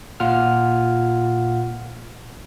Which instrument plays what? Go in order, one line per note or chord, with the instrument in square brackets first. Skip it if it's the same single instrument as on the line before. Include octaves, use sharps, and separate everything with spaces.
[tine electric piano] A#2 F4 F#5 F6